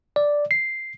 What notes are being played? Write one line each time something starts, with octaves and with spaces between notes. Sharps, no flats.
D5
C7